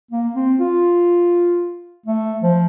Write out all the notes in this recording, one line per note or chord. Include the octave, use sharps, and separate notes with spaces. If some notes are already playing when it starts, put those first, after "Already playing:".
A#3
C4
F4
A3
F3